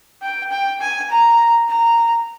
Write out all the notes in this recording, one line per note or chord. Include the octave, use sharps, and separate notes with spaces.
G5
G5
G#5
A#5
A#5